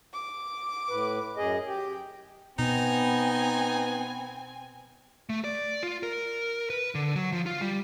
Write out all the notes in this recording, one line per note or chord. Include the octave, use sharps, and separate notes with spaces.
D6
A2 B4
F#2 G#4 D#5
G4 G5
B2 B3 C4 D#4 G#5
A3
D5
F4
A#4
B4
D3
F#3
F3
F4
G3